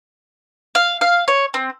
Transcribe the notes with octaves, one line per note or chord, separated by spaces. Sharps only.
F5
F5
C#5
C4